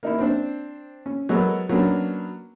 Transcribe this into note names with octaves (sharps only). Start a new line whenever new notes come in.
A#3 D#4 E4
C4 D4 C5
C#4
F#3 G#3 B3 F#4 A4 A#4
F#3 A#3 B3 C#4 D4